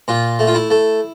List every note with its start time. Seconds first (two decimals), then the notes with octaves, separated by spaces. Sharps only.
0.08 A#2 F4
0.39 A3
0.47 F4
0.55 E4
0.70 A3